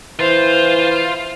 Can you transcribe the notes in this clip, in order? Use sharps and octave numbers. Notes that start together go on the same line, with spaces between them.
E3 F4 C5